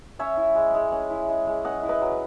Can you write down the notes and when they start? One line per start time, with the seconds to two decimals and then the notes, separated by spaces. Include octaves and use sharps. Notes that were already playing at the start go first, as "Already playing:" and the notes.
0.19 C#4 C#5 E5
0.37 E4
0.55 G#3
0.74 G#3
0.92 C#4
1.10 E4
1.29 G#3
1.47 G#3
1.65 C#4 D#5 F#5
1.83 E4
1.89 B4 D#5
2.01 F#3